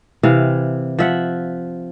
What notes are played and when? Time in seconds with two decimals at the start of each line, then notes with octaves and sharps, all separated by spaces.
0.23 C3 E3 E4 F5
0.99 F3 E5 F#5